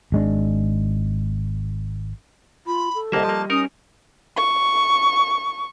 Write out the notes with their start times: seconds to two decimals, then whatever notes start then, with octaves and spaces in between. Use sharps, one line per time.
0.12 G#1 G#3 D4
2.66 F4 B5
2.94 A4
3.12 C2 G3 A#3 D#5 E5 A5
3.25 F3 A#3
3.50 C#4 D#4 A#4 D#6
4.36 C#6